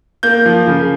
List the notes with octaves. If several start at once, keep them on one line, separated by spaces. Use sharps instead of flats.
A#3 G6
F3
C#3